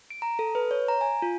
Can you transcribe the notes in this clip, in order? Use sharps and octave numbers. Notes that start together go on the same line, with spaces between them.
D7
A#5
A4
B4
C#5
A#5
G#5
F4